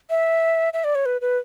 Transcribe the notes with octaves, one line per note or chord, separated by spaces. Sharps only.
E5
E5
D5
C#5
B4
B4